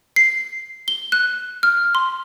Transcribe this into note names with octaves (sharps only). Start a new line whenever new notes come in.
C7
G7
F#6
F6
C6